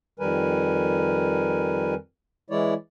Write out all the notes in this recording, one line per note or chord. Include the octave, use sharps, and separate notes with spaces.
F2 D#3 G3 A#4 B4 G#5
E3 G#3 E4 C#5 D5